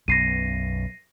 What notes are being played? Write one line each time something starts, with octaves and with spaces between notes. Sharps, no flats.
B1 F#2 B2 A#6 C7 D#7